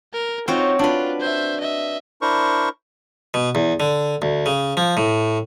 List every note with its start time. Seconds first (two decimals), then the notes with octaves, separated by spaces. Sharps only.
0.13 A#4
0.48 C4 D#4 F4 F#4 C#5
0.79 D4 F4 B4
1.20 C5 E5
1.61 D#5 E5
2.22 D4 E4 A#4 C5 C#6
3.34 B2
3.55 E2
3.80 D3
4.22 D2
4.46 C#3
4.77 F3
4.97 A2